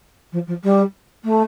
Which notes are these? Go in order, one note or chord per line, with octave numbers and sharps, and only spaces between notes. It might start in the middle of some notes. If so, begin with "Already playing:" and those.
F3
F3
G3
A3